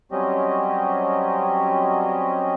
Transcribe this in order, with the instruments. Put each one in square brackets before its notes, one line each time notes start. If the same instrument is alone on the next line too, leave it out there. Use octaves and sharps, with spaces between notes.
[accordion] F#3 G3 C4 C#4 G4 D#5